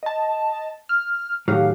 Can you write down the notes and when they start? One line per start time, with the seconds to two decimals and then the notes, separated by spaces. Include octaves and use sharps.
0.03 D#5 A5
0.89 F6
1.48 A2 D#3 F#3 G4 G#4 F5